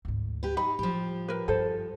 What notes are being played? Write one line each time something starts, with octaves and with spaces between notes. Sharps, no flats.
D2 G#2
G4 B4
D#4 B5
A2 F3 G3 G4
A#4 B4
G2 A4 C5